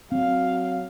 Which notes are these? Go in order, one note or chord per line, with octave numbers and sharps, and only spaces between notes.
F#3 C4 F5